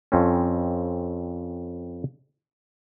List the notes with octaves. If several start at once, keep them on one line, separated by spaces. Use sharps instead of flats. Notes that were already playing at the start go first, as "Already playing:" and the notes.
F2 C4 C#4